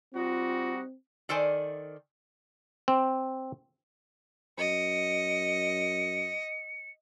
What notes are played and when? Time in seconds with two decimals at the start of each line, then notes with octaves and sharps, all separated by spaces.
0.14 G3 C4 D#4 F4 F#4
1.29 D#3 A4 C5 D5 G#5
2.88 C4
4.58 F#2 D#5 C#7